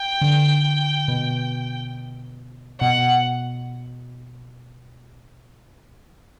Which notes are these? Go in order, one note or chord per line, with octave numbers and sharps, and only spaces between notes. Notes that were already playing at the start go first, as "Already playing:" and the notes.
Already playing: G5
D3
B2
B2 F#5